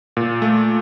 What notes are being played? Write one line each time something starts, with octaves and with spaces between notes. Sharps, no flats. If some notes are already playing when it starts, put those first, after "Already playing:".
A#2
A3